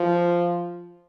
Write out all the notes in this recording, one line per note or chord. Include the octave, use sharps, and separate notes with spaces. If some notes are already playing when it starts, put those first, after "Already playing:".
Already playing: F3